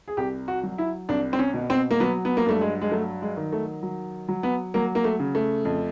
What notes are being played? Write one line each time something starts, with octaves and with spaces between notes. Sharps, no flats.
G#4
C2 G4
F#4
F#3
E4
C2 D4
C4
C#4
B2
C4
A#3
F#3 B3
B3
A#3
G2 A3
G#3
G#3
F#3 A3
G#3
D#3
A3
F#3
F#3
B3
F#3 A#3
A#3
A3
C#3
A3
F2